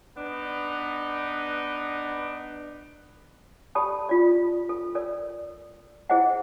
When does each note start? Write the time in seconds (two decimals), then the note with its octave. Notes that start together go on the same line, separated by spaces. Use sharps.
0.18 B3 D4 D#4
3.75 G4 A4 D5 A5 B5 D#6
4.09 F4 D5
4.69 A4
4.95 A4 A#4 D5
6.09 E4 G#4 C5 D#5 F#5